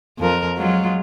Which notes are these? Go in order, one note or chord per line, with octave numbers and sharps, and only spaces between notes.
F2 F3 A#4
F#3 G#3 F4